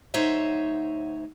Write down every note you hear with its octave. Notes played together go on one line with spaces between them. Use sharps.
D2 F#3 D#4 C5 C#5 E5